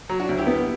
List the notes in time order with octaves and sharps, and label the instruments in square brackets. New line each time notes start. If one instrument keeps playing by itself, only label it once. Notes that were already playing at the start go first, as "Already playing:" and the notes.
[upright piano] F#3
[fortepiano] D4 F#4
[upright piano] D2
[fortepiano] E4 G4
[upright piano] B3